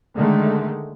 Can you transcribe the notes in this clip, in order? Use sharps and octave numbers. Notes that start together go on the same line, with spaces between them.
D3 D#3 G#3 A3